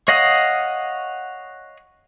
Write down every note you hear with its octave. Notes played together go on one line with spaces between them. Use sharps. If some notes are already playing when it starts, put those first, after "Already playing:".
C#5 D#5 F5 F#5 D#6